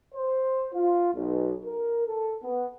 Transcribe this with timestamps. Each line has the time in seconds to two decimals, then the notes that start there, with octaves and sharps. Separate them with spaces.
0.15 C5
0.73 F4
1.14 B1
1.65 A#4
2.07 A4
2.44 B3